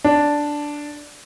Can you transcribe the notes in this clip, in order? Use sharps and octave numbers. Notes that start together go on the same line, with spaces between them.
D4